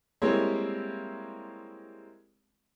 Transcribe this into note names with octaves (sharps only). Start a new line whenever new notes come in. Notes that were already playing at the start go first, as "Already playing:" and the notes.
G3 G#3 A#3 C4 E4 C#5